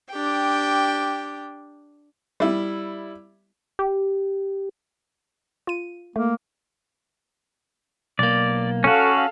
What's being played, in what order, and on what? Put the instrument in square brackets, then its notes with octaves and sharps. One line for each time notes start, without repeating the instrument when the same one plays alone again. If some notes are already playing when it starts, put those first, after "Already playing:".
[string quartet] D4 G4 G5
[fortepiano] G3 E4
[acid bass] G4
[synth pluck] F4 D#7
[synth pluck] A3 [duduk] A#3
[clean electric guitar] B1 A#3 [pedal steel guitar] D5
[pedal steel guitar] C#4 F#4 [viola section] A4 F5